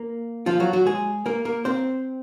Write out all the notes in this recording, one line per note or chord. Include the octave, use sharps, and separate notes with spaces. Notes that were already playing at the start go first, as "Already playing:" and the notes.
Already playing: A#3
F3 F4
F#3 F#4
F#3 F#4
G#3 G#4
A#3 A#4
A#3 A#4
C4 C5